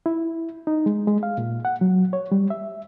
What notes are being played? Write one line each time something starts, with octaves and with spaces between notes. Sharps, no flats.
E4
D#4
G#3
G#3
F5
A#2
F#5
F#3
C#5
G3
E5